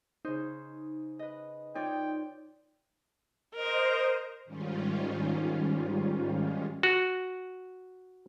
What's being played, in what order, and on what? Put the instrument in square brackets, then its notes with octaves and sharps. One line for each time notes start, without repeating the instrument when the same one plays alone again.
[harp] C#3 C5 [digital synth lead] D#4
[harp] B4 D#5
[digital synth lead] D#4 [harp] F4 C#5 D5 [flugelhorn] G5
[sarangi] A#4 [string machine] C5 D#5
[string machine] G#2 D#3 G3 C#4 F4
[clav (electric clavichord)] F#4